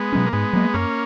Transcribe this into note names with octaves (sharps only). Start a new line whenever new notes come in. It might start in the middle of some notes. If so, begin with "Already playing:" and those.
Already playing: G#3 B3
B2 F#3 C#4
A#3
G#2 G#3 B3
F#3 A#3
F#2 A#3 C#4